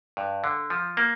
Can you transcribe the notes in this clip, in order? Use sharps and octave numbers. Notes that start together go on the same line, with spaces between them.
G2
D3
F3
A#3